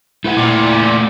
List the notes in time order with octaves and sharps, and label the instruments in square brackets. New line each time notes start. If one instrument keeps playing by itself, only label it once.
[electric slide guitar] A3 B4 F#5 [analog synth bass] E4
[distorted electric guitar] A#2 [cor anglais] D5